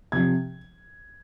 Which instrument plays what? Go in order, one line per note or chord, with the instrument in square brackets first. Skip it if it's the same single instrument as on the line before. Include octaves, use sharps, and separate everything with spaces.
[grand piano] C3 F3 G#6